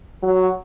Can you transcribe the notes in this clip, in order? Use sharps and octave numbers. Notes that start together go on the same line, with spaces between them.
F#3